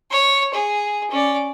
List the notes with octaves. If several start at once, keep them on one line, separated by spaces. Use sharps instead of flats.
C#5
G#4
C#4 D5